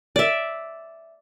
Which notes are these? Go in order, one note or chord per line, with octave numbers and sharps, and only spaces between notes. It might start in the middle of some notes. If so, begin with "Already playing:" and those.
D5 E5